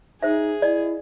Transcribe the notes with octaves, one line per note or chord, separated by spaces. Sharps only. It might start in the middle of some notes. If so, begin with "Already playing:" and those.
D#4 G#4 C5 E5
E4 D5 D#5